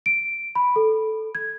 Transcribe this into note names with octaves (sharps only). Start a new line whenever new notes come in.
D7
B5
A4
G#6